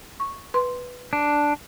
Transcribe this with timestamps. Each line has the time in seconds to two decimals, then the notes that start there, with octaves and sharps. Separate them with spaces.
0.20 C#6
0.54 B4 C6
1.13 D4